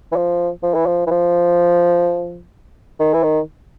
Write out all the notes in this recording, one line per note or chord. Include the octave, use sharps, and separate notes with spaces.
E3
F3
F3
E3
F3
E3
F3
D#3
E3
D#3